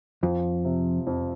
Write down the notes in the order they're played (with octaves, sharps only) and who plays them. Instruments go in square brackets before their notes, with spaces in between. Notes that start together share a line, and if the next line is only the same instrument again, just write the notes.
[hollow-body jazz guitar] F2 [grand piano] F3
[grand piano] C3
F2